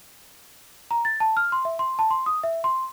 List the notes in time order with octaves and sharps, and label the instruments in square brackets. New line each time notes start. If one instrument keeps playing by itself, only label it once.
[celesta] A#5
A6
A5
F6
C6
E5
C6
A5
C6
D#6
E5
C6